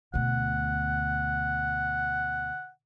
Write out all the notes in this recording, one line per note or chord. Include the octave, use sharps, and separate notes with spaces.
D2 B2 F#5